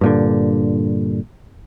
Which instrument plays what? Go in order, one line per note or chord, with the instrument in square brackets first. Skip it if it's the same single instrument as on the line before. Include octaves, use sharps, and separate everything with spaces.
[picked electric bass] G2 A#2 D3